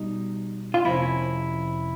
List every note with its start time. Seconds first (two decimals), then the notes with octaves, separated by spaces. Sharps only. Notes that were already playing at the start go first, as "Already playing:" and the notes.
Already playing: B2 G3 D#4
0.74 F4
0.85 F2 C3 F3 A#3 C#4 E4